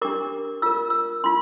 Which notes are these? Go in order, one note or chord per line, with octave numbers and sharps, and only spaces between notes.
D4 G4 A#4 D6
F4 A#4 E6
E6
D4 F4 C6